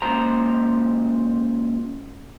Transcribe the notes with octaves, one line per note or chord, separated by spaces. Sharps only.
C#2 A#2 C5 A#5